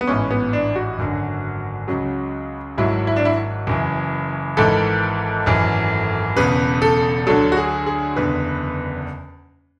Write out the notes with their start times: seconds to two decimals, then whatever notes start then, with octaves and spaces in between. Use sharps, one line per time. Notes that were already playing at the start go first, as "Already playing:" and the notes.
0.01 B3
0.07 A1 G#2 E3 C#4
0.31 B3
0.53 D4
0.76 F#4
0.98 G#1 F#2 D3
1.88 C#2 C#3 F#3
2.78 G#1 G#2 F#3 E4
3.07 E4
3.16 D4
3.25 E4
3.67 F#1 F#2 E3
4.57 G#1 G#2 E3 A4
5.46 G#1 F#2 E3
6.36 E1 E2 C#3 B4
6.82 A4
7.27 D2 D3 F#3 A4
7.52 F#4
7.57 G#4
7.86 G#4
8.16 F#1 E2 D3 B4